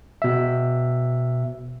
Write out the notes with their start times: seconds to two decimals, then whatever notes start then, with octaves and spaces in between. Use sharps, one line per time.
0.22 B2 E5